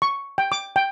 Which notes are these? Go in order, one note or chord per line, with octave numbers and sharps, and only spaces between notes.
C#6
G5
D6
G5